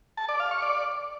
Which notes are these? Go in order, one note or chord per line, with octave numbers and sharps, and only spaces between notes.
A5
D5
F5
C#6
D5